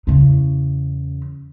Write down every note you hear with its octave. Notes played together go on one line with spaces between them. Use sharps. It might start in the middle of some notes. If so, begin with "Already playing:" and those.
E2 C#3